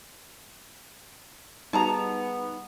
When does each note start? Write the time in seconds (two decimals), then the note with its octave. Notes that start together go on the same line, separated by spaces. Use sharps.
1.73 G3 B3 D#4 F#4 G#4 A5 A#5